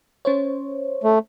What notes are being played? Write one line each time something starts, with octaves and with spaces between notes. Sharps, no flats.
C#4 C5 C#5
A3